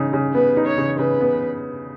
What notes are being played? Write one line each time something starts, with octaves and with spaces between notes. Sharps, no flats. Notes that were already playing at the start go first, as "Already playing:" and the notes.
Already playing: C#3 D#4
C#3
B3 B4
D#4
C#5
C#3
C#3 B4
B3